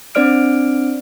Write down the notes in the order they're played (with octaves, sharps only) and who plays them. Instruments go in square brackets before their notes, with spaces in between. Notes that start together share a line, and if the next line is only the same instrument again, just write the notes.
[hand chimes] C4 D4 C5 D5 F6 D7